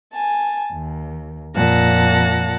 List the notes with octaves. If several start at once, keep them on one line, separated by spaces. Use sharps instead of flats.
G#5 A5
D#2
F2 A#2 F#5 A5 A#6